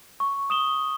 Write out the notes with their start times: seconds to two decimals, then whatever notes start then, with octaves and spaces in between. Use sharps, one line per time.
0.20 C#6
0.50 D#6 E7 G7